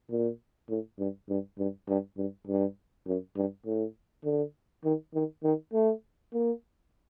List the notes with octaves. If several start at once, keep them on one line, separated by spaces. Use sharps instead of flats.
A#2
A2
G2
G2
G2
G2
G2
G2
F#2
G2
A2
D3
D#3
D#3
D#3
A3
A#3